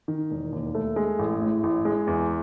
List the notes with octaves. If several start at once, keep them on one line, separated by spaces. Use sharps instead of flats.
D#3
E1
D#2
A3
G#3
A1
A2
A1
G#3
E2